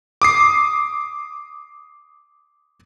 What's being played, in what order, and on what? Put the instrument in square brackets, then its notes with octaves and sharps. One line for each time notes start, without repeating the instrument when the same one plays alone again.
[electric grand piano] D6 D#6 C7